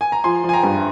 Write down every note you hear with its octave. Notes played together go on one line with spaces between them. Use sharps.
G#5
A#5
F3 G#5 C6
F3
G#5
G5 A#5
G2